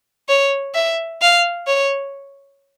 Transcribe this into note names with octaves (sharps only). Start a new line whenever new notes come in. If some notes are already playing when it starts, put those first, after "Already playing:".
C#5
E5
F5
C#5